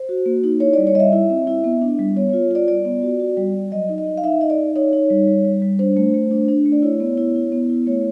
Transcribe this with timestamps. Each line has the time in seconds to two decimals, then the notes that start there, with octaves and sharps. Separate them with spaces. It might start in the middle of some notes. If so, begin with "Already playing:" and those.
Already playing: C5
0.09 F#4
0.26 A#3
0.44 D#4
0.60 E4 C#5
0.73 D5
0.78 G3
0.87 C#5
0.95 G3 D#5 E5
1.13 E4
1.30 C4
1.47 E4
1.64 B3
1.82 D4
1.99 G3
2.16 B3 C#5
2.29 F4 C#5
2.51 F4 D5
2.68 G3 D5
2.85 B3
3.03 F#4
3.20 F#4
3.37 G3
3.54 G3
3.72 F#3 D#5
3.89 D#4
3.98 D#5
4.06 D#4
4.18 F5
4.24 D#4 E5
4.41 D#4 D#5
4.50 D5
4.58 D#4
4.76 D#4 C#5
4.93 D#4
5.10 G3
5.27 G3
5.45 G3
5.62 G3
5.79 D4 C5
5.97 A3
6.14 A3
6.31 D4
6.48 D4
6.66 A3
6.72 D5
6.82 E4 C#5
7.00 B3
7.17 E4
7.35 E4
7.52 B3
7.69 E4
7.87 A3 C#5